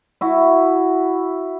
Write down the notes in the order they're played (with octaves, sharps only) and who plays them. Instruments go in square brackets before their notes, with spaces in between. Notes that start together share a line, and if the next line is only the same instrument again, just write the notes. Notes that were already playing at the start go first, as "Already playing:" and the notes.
[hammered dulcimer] E4 F#4